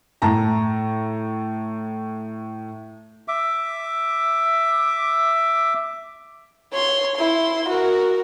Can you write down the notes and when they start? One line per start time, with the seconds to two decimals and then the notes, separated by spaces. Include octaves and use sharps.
0.22 A2 A5 A#5
3.28 E5 D6
6.73 C#5 C6
7.16 E4 C6
7.69 F#4 A#4